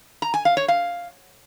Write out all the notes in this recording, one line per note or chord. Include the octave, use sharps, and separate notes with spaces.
A#5
G#5
F5
C#5
F5